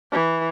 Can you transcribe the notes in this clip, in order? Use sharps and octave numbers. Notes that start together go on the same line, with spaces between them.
E3